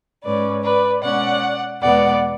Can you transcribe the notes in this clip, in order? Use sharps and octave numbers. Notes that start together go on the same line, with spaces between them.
G#2 G#3 C#4 B4 D5
B4 D5
B2 G#3 C#4 D5 F#5
E2 B2 G#3 B3 D5 F#5